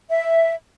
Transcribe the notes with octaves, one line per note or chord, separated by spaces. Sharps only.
E5